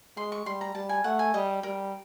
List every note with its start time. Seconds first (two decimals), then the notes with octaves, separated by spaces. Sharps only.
0.17 G#3 C6
0.32 C#6
0.46 G3 C6
0.61 A#5
0.75 G3 A5
0.89 G#5
1.04 A3 F#5
1.19 G#5
1.34 G3 D#5
1.63 G3 A#4